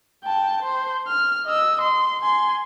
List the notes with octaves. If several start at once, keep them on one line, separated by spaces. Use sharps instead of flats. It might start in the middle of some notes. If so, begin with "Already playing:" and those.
G5 A5
C5
F6
D#5 E6
C6
G#5 C6